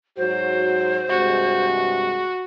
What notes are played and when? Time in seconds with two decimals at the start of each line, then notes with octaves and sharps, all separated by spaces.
0.18 G#2 F#3 F#4 C5
1.10 G2 C3 G#3 F#4